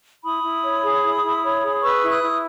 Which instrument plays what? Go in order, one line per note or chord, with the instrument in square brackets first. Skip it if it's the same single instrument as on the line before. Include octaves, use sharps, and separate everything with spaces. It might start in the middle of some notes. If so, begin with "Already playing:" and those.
[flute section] E4 B5 D#6
E4
C#5
G#4
E4
E4
C#5
G#4
B4 C#6 E6
E4
D#6 F#6
E4